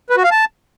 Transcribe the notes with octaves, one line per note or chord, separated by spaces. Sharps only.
B4
F#4
F5
A5